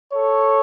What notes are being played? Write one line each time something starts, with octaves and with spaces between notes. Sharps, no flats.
A4 C#5